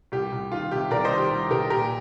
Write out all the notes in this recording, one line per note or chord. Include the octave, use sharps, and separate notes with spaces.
C2 G4
C2
D#3 F4
C3 G4
C2 A#4 D5
C5 D#5
D#3
G4
C2
C2 G4 A#4
A#2 G4 A#4